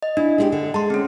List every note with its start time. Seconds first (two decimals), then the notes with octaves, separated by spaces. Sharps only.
0.03 D#5
0.17 D4 E4
0.38 G#3 E4 G4
0.52 D3
0.74 G#3 A5 C6
0.90 C4 C#4